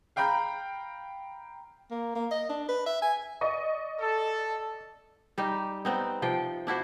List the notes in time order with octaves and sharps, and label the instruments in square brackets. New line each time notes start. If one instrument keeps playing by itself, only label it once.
[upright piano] F5 G5 A#5 B5 G6
[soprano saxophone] A#3
A#3
D#5
D4
B4
E5
G#5
[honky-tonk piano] D5 D#5 C#6
[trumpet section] A4
[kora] G3 D#4 G4
B3 C4 D#4
C3 F3 G5
D4 E4 F#4 C5